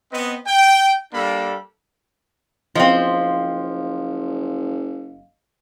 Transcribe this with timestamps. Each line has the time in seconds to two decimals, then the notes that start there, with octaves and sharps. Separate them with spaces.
0.12 B3 C4 B4 D#5
0.46 G5
1.13 G3 A#3 D4 A4 B5
2.75 F#1 F3 C4 D#5 F5